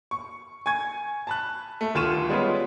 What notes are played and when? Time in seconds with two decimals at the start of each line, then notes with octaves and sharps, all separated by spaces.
0.11 C#6
0.66 G#5 C#6 G#6
1.27 A5 B5 F#6
1.81 A3
1.94 D#1 D2 F4 C#6 D#7 E7
2.29 G3 G#3 B3 C#4 F4